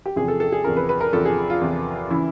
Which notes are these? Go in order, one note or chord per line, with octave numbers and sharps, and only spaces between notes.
G4
E2 C3 F3 G#4
A4
A4
G#4
E2 C3 F3 A#4
B4
B4
A#4
E2 C3 F3 A4
G#4
F4
E2 C3 F3
C#3 E3 E4